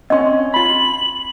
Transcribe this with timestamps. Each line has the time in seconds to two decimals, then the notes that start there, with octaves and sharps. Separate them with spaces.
0.10 C4 C#4 D#5 C6
0.54 F4 B5 F#7